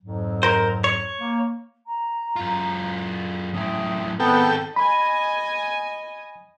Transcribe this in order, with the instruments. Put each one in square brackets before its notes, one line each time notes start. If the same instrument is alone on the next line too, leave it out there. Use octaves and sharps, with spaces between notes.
[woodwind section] F2 G#2 F#3
[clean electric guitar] A#4 C5
C#5
[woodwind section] A#3
[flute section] A#5
[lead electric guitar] F#2 F4
[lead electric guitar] F#2 A2 [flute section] E5 G5 D#6
[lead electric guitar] D#3 C4 [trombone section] B3 [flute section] G#4 D5 [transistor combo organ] A4 G5
[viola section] D#5 G#5 [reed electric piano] B5